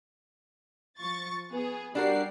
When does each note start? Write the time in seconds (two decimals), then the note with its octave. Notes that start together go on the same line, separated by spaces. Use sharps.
0.99 F3 C#6 A6
1.50 B3 G#4
1.95 G3 D4 F#4 A#4 C7